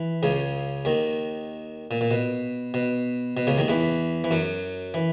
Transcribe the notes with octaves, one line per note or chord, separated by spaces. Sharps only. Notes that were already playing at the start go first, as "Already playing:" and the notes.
Already playing: E3
C#2 C#3
D#2 D#3
A#2
A#2
B2
B2
B2
C#2 C#3
D#2 D#3
E2 E3
E3
F#2 F#3
E3